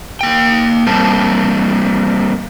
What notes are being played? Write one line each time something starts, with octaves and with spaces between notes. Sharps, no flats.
A#3 G5
G3 A#3 C4 A5